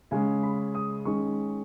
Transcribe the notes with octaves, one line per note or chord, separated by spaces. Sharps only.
C#3 G#3 C#4 G#5
B5
D#6
D#3 G#3 C#4 C#6